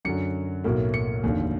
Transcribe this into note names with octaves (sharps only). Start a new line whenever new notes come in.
F#2 D3 F#3 C#7
B1 A2 F#3 A#3
C#7
F1 D#2 D3